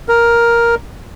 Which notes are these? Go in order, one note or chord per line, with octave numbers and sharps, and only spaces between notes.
A#4